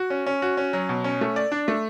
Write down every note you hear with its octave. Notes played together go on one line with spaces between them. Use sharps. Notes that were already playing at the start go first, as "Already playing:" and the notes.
Already playing: F#4
C#4
C#4
F#4
C#4
F#3
B2
C#4
A3
D5
D4
A3